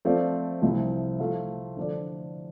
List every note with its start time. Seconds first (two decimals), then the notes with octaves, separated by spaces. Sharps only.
0.05 F3 A3 C4 F4 D5
0.62 C2 C3 F3
1.20 F3 A3 F4
1.77 D3 F3 D4 A4 D5